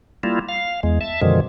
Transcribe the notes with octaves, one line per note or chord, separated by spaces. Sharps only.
G3 A#3 E4 F4
F5
E2 G#3
E5 A5
F#2 B2 D3 D#3 F3 G#3